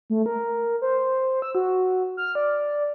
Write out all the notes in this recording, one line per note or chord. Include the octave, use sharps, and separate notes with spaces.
A3
A#4
C5
E6
F#4
F6
D5